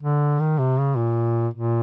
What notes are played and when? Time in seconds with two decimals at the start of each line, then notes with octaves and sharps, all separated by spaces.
0.03 D3
0.40 D#3
0.59 C3
0.78 C#3
0.97 A#2
1.54 A#2